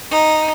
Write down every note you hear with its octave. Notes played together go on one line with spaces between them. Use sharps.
D#4